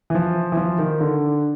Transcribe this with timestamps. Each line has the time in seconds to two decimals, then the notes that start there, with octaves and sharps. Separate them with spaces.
0.10 E3
0.15 F3
0.52 E3
0.57 F3
0.79 D#3
1.01 D3